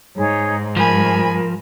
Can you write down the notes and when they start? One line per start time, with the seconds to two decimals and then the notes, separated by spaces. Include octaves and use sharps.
0.16 G#2 D#4 G#4 C#5
0.77 F3 A#4 G#5 B5